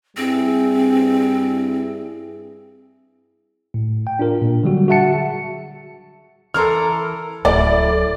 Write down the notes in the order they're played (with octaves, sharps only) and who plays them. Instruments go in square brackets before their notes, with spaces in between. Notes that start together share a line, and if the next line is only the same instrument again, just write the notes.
[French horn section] G2 E4 G#4 [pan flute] C4
[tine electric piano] A2
G5
D4 F4 A#4
A#2
D3 F#3 G3 F#4
F#4 G#4 E5 F#5 A5 C#7
[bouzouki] E3 A#4 A#5 [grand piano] A4 C6 F6
[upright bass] D1 F#3 [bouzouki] A2 [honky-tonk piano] D5